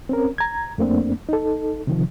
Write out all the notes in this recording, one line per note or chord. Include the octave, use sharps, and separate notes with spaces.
C4 C#4 A#4
A#5 G#6
F2 A3 A#3 C4 D4
D#4 A4
C3 D#3 F3